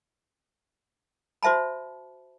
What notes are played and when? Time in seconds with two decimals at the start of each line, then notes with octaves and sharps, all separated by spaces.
1.43 F#4 C5 E5 A5 B5